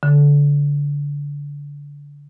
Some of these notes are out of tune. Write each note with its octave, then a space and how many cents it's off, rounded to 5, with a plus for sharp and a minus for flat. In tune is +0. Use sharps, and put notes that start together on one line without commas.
D3 -25